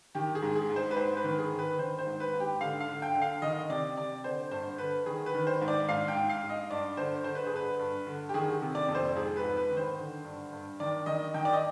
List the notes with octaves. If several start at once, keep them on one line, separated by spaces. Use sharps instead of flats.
D#3 G4
G#4
G#2
G#4
G#2
C5
B4
G#2 C5
B4
D#3
G#4
D#3
B4
D#3 C5
C5
G#2
B4
G#2
G4
D3 F5
F5
D3
G5
D3
F5
D#3 D#5
C3 D5
C3 D5
D3 C5
G2 C5
D3 B4
D#3 G#4
B4
D#3
C5
G#2
D5
G#2 F5
G5
G#2
F5
G#2
D#5
G2 D5
D3 C5
D3 C5
B4
G#4
G2 B4
G2
D3
G4
D#3 G#4
C3
D5
F2
C5
G#2 G#4
B4
G#2
B4
D#3
C5
D3
G2
G2
D#3 D5
D#3 D#5
D#3 G5
D5
D#5